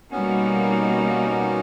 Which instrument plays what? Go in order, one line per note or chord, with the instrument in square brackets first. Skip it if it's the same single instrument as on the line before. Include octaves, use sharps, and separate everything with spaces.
[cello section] B2 G3 A#3 D#4 F#4 [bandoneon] B3 C#4